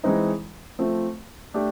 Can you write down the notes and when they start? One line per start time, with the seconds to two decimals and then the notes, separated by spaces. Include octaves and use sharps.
0.03 E3 G#3 C4 D#4
0.79 F3 A3 C4
1.54 A3 D4 G4